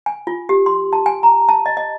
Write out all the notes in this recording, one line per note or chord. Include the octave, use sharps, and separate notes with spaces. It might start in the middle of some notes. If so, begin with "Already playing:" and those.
G#5
F4
G4
C6
A5
G#5
A#5
A5
D#5
D#5